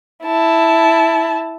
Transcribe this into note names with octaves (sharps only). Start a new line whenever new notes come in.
E4 A5